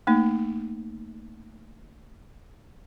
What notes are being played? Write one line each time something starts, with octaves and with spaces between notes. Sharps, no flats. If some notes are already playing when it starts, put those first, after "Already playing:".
A3 A#3 D#4